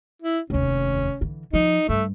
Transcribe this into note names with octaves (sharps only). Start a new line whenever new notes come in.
E4
F1 D#2 C#4
D3 E3
F3 D#4
G2 A3